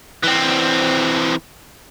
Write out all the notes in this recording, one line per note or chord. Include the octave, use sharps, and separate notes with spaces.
E3 C4